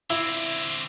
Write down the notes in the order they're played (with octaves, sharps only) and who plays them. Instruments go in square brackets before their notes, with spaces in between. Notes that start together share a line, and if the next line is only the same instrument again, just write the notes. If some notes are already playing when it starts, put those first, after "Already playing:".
[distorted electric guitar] D3 C4 [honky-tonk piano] E4